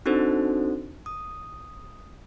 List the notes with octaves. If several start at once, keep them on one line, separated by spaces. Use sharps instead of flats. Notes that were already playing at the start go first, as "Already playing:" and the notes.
C4 D4 D#4 F#4 A4 C5
D#6